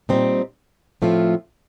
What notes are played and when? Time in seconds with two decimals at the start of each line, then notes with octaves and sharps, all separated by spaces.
0.09 A#2 G3 C4 D#4
1.02 A2 F3 A3 C4 F4